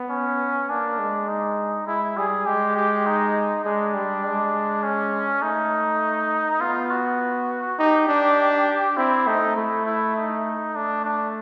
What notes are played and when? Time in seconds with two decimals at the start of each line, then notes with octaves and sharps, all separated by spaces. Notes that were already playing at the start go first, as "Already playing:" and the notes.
Already playing: B3
0.10 C#4
0.69 A#3 D4
0.99 G#3
1.28 D#4
1.87 G#3 E4
2.17 G3 G#4
2.46 G#3 G4
2.76 G4
3.06 D#4
3.65 G#3 D4
3.94 G3
4.24 G#3
4.83 C#4
5.42 A3 D#4
6.61 B3 F4
6.90 F#4
7.79 D#4 G4
8.09 D4
8.97 C4 E4
9.27 A3 D#4
9.56 A3 E4
9.86 E4
10.16 D#4
10.75 A3 D4
11.05 D4